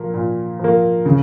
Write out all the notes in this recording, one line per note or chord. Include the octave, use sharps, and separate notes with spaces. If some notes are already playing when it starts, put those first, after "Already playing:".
Already playing: A#2 F3 A#3
A#2
F3 A#3
C#3